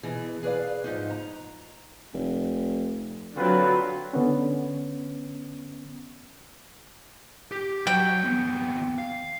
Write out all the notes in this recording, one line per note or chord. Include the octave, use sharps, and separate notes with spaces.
B2 E3 G#4
G#4 B4 C#5 D5 F5
G#2 F3 D#4
A#5
F1
D3 F#3 C4 D4 F4 B4
D3 B3 C#4
G4
F#3 G5
D#2 B3
F5